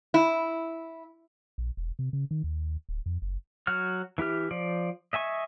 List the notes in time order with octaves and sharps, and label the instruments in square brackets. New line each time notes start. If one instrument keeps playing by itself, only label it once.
[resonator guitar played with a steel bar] E4
[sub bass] A#1
E1
C3
C#3
D#3
D#2
D1
F2
F#1
[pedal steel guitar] F#3 F#4 F6
E3 E4 G4 F6
F3 D5
D#5 E5 G#5 C#6